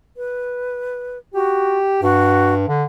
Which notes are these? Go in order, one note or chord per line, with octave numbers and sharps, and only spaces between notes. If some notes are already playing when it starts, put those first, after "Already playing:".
B4
F#4 G4
G2 F#4
D3